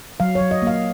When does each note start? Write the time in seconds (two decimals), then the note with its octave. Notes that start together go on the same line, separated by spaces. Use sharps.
0.20 F#3 F5
0.35 C#5
0.40 F#3
0.51 D#5
0.62 A#3 F5